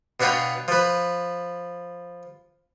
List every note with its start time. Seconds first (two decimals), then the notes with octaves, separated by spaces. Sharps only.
0.20 B2 D4 B4 C#5 F5 G5
0.68 F3 B4